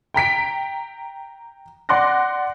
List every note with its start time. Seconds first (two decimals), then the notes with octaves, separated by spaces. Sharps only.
0.14 G5 A#5 B6 D7
1.89 D5 F#5 C6 D6 F#6 A#6